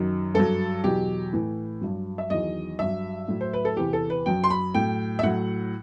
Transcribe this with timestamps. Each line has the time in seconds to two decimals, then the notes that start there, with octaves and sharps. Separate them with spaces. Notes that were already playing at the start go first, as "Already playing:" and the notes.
Already playing: F#2 D#3 F#3
0.34 G2 F#3 A4
0.84 E2 B2 F#3 G4
1.33 A2 E3
1.81 G2 F#3
2.18 E5
2.30 E2 D#3 F#3 D#5
2.79 G2 F#3 E5
3.28 A2 F#3
3.41 C5
3.53 B4
3.65 A4
3.77 E2 C3 E3 G4
3.93 A4
4.10 B4
4.26 F#2 F#3 G5
4.44 C6
4.50 B5
4.74 A2 F#3 G5
5.19 E5
5.23 A2 F#3 F#5